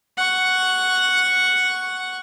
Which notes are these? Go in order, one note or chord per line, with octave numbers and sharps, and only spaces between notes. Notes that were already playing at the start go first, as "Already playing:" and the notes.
F#5 C#6